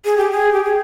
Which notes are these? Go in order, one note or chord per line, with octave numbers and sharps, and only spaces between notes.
G#4
G4
G#4
G4
G#4